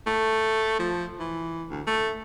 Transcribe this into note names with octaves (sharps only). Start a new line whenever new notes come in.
A3
F3
E3
D2
A3